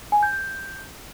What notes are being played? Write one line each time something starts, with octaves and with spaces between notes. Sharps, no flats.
G#5
G6
G6